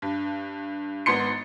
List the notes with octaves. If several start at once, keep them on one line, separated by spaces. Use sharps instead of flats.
G2
G#1 B3 D#4 C6 C#7